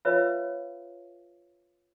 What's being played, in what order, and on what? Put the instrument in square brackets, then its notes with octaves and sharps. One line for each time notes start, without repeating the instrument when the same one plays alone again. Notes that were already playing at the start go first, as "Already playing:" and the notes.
[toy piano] F4 B4 C#5 E5 F5